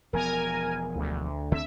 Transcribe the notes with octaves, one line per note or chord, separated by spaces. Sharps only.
E1 F3 B3 A#4 G#5
D2
D3 C4 E5